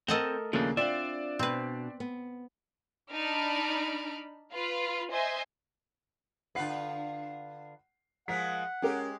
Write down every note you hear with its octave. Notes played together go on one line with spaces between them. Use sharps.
A3 C4 A4 A#4 D#5 F#5
D#2 C#3 F3 A3 A#3 D4
C4 D4 F4 D5 E5
B2 C4 B4
B3
D4 D#4 A5 B5 F6 D7
F4 B4 F5
C5 D#5 E5 G#5 C6
D3 F4 B4 F#5 C7
F3 G#3 A#4 F#5 B6
G#3 C#4 G4 A#4